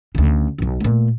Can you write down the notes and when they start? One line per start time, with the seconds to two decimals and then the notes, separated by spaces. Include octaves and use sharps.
0.15 D2 C#3
0.58 D1 B1
0.80 A#2 A3